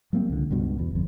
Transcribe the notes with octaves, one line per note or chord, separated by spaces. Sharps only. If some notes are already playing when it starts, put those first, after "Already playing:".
F#3 G3 A#3 C4
C#2 D3
C#2 G2 B2
E2
G1 F2